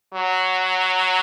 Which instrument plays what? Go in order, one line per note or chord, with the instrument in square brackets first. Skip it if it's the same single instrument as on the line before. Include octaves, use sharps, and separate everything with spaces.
[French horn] F#3